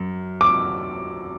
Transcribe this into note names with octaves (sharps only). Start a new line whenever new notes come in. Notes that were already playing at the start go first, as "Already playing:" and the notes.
Already playing: F#2
D6